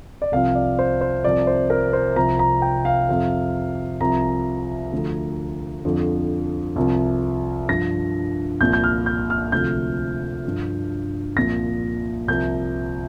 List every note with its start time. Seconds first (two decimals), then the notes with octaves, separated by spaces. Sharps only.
0.22 D5
0.32 C2 C3 F3 F5
0.55 D5
0.79 C5
1.01 C5
1.24 C2 C3 F3 D5
1.47 C5
1.70 A#4
1.93 C5
2.16 C2 C3 F3 A#5
2.39 A#5
2.62 G5
2.85 F5
3.09 F2 C3 F3
4.00 C2 C3 F3 A#5
4.92 D2 D3 F3
5.85 F2 D3 F3
6.76 C2 C3 F3
7.69 G2 F3 A#6
8.61 C2 A#2 F3 G6
8.73 G6
8.84 F6
9.06 G6
9.30 F6
9.52 D2 C3 F3 G6
10.45 G2 F3
11.36 C2 A#2 F3 A#6
12.28 C2 C3 F3 G6